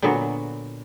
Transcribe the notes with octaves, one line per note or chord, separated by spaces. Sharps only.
A#2 D3 F#3 B3 F#4